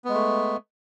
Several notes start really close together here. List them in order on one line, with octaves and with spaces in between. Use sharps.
B3 G#3 A3